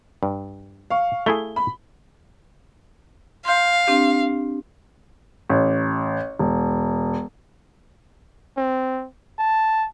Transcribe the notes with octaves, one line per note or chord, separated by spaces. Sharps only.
G2
F5 C#6
A3 E4 G#4 G7
B5
F5 C6 F6 G6
C4 D4 G4
A1
E1
C4
A5